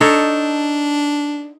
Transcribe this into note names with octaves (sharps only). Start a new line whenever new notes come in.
D4 D#4 A4 C#5